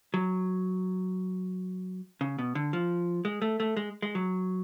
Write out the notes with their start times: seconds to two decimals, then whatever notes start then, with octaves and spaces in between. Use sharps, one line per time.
0.14 F#3
2.21 C#3
2.39 B2
2.55 D3
2.73 F3
3.25 G#3
3.42 A3
3.60 A3
3.77 G#3
4.02 G#3
4.15 F#3